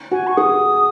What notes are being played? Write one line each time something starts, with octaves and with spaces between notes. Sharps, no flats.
F#4 G#5
C#6
G#4 D#6